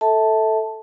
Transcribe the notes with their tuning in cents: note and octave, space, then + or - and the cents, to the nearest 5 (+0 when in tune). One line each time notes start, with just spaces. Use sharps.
A4 +0 E5 -25 A5 +0